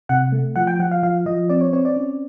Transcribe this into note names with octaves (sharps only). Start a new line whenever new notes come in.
C3 F#5
A3
F3 F#5
G5
F3 F#5
F5
F3 F5
F3 D#5
C4 D5
C#5
C4 C#5
D5
C#4